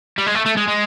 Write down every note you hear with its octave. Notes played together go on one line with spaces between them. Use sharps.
G3
G#3
A3
A3
G#3
G#3